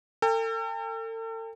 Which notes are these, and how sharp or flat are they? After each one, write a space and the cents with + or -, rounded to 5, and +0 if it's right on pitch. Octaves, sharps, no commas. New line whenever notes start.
A4 +40 G5 +45